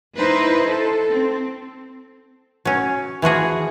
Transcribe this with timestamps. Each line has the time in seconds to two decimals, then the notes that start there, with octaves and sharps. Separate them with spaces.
0.18 D#4 E4 B4 C5
0.67 A4
1.12 C4
2.65 F#3 C#4
3.22 E3 F3 F#4 G#4